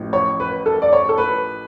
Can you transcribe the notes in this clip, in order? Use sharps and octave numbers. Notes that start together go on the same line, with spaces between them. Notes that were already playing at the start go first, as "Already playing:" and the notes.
Already playing: A1 A2 F3
C#5
B4
A4
D5
C#5
A4
B4